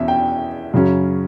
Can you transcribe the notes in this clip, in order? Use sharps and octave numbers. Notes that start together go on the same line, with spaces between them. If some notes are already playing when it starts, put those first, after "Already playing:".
Already playing: E2 B2 C#4 E5
G5
F#2 C#3 F#3 C#4